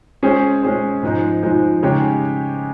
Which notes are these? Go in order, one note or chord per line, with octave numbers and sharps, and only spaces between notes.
G#3 C#4 G#4 C5
G#3 C#4 G#4 C5
G#2 F3 G#3 D#4
G#2 F3 G#3 D#4
C#3 G#3 D#4 G4 C#5